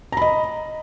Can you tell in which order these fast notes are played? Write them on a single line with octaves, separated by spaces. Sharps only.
A#5 B5 D#5